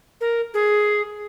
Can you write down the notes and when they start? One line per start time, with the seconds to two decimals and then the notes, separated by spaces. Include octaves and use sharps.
0.21 A#4
0.54 G#4